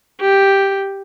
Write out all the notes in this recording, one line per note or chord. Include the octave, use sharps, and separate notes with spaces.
G4